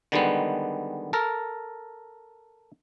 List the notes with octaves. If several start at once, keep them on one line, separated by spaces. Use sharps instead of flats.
D3 D#3 G3 G#3 B3
A4 A#4